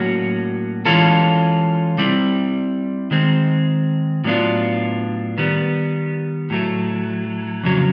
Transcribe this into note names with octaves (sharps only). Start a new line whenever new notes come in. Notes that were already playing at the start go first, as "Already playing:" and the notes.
Already playing: A2 F#3 A#3 C#4 F#4
E3 G#3 C#4 F4 A4
G3 C4 E4
D#3 G#3 C4
A2 F#3 B3 D4 F4
D#3 G3 B3
A2 F#3 A3
F2 C#3 F#3